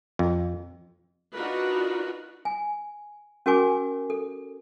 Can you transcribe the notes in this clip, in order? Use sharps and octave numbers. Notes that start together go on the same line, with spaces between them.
F2
D4 D#4 F4 F#4 A#4 B4
G#5
C#4 F#4 A#4 G#5 D6
A4